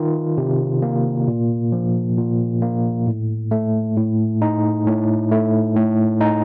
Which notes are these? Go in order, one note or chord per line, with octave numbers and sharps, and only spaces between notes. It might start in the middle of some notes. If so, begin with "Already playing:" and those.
Already playing: D#3 F4
C3
A#3
A#2
F3
A#2
A#3
A2
A3
A2
D#4
A2
A3
A2
D#4